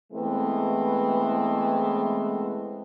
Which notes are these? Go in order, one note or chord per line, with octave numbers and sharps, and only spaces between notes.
E3 G#3 A3 B3 C4